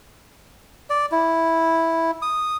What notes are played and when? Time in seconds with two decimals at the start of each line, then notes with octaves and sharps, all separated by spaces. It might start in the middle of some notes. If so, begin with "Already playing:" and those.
0.90 D5
1.12 E4
2.22 D#6